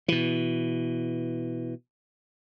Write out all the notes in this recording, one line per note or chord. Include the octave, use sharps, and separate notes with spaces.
B2 E3